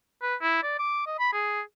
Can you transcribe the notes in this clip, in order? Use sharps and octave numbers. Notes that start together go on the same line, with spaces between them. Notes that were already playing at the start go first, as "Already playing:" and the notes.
B4
E4
D5
D6
D#5
B5
G#4